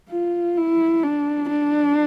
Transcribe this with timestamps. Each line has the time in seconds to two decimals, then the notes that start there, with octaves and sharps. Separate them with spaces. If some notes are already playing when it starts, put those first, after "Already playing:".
0.11 F4
0.57 E4
1.03 D4
1.49 D4